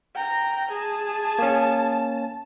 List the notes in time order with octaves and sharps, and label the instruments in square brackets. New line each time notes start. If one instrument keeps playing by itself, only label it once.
[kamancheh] G5 A#5
[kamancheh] G#4 [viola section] A5
[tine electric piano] A#3 C#4